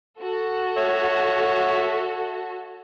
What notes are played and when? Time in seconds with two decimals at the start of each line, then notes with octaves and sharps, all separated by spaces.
0.20 F#4 A4
0.78 C#5 E5